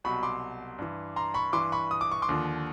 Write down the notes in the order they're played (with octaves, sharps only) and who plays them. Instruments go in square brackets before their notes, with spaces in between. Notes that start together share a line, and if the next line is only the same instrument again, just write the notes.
[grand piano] C2 B2 F#3 B5 C#6
C6 D6
G2 E3
A#5 C6
B5 C#6
G2 E3 C6 D6
B5 C#6
D#6
D6
C#6
C6 D6
D#2 D3 F3